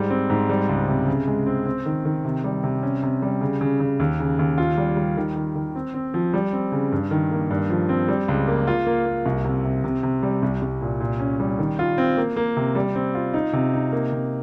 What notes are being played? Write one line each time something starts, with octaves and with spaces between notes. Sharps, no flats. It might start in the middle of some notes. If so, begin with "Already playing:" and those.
Already playing: G#2 G3
C4
G#2
G3
C#2
C3
C#3
G#3
C4
C4
D#3
D#3
C3
G3
C3
C#4
C3
G3
C#3
C#3
C#3
D#2
C#3
D#2
F4
G3
G3
D#3
D#3
D#3
C4
C4
F3
G3
C4
C#3
G2
D#3
A#3
G2
F3
C4
G3
C#2
A#3
F4
A#3
A#3
C2
C3
C3
C3
C3
G3
C2
C2
A#2
A#2
C#4
G3
D#3
F4
C4
A#3
A#3
C3
G3
C4
F4
D#4
C3
D#4
A#3
C3